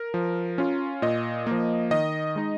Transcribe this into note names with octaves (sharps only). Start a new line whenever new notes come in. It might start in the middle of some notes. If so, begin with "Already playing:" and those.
Already playing: A#4
F3
C#4 F4
A#2 D#5
F3 A#3
D#3 D#5
G#3 D#4